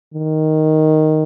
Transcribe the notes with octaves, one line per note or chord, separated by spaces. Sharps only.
D#3